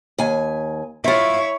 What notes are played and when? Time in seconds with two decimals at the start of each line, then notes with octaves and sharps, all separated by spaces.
0.18 D#2 G#5
1.04 E4 F4 C#5 E5